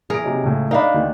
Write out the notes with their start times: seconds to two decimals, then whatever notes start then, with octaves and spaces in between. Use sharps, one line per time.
0.10 E3 G#4 A#4 D7
0.24 C3 F#3 D#4
0.43 C#2 A2
0.71 D4 D#4 A#4 F5 B5
0.94 D2 D#3